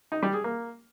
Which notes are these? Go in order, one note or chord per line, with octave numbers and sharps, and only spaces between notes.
D#4
G3
G#4
A#3